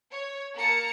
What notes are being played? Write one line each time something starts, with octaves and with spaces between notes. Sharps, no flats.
C#5
A#3 A#4 A5 A#5 C#7